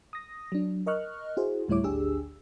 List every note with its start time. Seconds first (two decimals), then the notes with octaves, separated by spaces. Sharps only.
0.13 D#6 A#6
0.52 F#3 D4
0.86 A#4 D#5 C#6 F6 F#6
1.37 E4 F#4 G#4 C5
1.68 D2 A2 G3 E4 C#5 D6
1.84 G#1 D2 D4 G4 G#4 E6